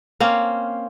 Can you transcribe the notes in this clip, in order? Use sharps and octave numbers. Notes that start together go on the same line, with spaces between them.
A#3 C4 C#4